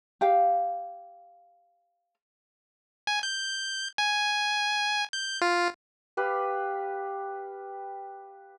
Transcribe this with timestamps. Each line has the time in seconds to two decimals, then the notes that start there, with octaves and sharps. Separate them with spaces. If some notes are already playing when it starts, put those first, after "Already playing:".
0.21 G4 F5
3.07 G#5
3.23 G6
3.98 G#5
5.13 G6
5.42 F4
6.17 G4 B4 F5